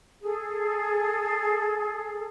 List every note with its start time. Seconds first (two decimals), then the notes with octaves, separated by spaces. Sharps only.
0.21 G#4 A4